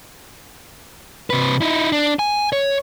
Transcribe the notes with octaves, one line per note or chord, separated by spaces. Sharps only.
C3 B4
D#4 E4
D4
G#5
C#5